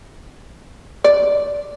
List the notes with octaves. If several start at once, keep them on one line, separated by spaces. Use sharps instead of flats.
D5